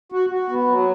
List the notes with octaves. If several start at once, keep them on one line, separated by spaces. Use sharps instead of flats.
F#4
F#4
B3
F#3